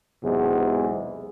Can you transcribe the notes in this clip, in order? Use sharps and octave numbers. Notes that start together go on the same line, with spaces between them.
B1 E2 G#2 C3 G#3